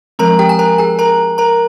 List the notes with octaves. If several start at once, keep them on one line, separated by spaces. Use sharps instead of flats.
F3 G#3 C4 A#4 A#5
G4 G5
G#5
A#4 A#5
G#4 G#5
A#4 A#5
A#4 A#5